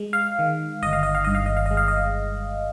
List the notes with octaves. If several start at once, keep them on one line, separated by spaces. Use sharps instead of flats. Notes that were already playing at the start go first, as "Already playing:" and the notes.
Already playing: G#3
F5
D#3
G1 D#5
F5
D#5
F5
G2 D#5
F5
D#5
F5
G#3 D#5
F5
D#5